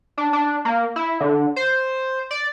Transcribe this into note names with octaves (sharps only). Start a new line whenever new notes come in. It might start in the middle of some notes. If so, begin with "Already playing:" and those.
D4
D4
A#3
E4
D3
C5
D5